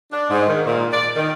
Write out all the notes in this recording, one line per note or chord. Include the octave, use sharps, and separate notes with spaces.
D4
G#2
D#3
A#2
D5
D#3